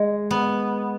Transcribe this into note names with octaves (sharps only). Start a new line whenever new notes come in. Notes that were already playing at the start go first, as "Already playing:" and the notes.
Already playing: G#3
B3